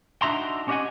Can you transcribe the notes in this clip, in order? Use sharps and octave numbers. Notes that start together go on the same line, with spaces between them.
D4 D#4 F#4 E5 A#5 C6
C#4 G4 D#5 E5 F#5 G#5